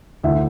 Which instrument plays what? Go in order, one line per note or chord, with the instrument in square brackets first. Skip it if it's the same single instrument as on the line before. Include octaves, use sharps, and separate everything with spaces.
[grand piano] D2 D3 E4 E5